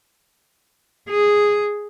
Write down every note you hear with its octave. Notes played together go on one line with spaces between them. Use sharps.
G#4